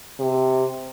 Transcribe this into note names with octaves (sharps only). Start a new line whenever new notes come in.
C3